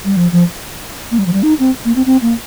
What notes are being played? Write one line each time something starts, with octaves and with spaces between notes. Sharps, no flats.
G3
F3
F3
A#3
G3
F3
G3
D#4
C4
A#3
C4
C4
A#3